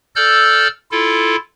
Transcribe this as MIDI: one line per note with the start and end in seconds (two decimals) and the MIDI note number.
0.16 0.68 69
0.16 0.68 74
0.16 0.68 88
0.16 0.68 89
0.16 0.68 91
0.91 1.36 64
0.91 1.36 65
0.91 1.36 69